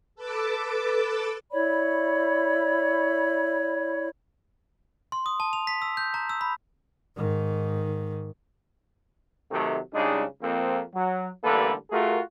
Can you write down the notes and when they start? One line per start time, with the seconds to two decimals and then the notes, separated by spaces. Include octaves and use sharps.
0.15 A4 B4 A5 D6
1.52 E4 C#5 D5 B5
5.12 C6
5.26 D#6
5.40 A5
5.53 F7
5.67 B6
5.82 E6
5.97 G6
6.14 A#5
6.29 E6
6.41 B5
7.16 G#2 D#3
9.51 C3 D#3 F#3 A3
9.94 C#2 C#3 G3 G#3 D4 D#4
10.42 F2 A#3 C4
10.94 F#3
11.44 A1 D3 G3 A#3 A4 B4
11.90 A3 F4 F#4 G#4 A#4